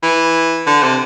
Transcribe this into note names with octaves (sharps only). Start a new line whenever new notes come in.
E3
D3
C3